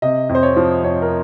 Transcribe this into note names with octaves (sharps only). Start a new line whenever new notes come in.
C3 D#5
F2
C5
C#5
F3
F2 C#5
A#4